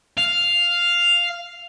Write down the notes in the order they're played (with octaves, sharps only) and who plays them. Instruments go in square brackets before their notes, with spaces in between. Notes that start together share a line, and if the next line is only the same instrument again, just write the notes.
[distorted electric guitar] F5